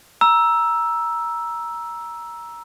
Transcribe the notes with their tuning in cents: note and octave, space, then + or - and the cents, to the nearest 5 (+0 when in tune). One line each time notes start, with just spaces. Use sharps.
A#5 +15 E6 +0